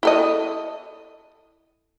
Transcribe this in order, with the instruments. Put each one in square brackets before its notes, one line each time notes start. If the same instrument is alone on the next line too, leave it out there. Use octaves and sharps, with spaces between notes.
[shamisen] E4 A4 D#5